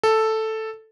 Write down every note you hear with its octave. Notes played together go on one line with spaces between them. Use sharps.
A4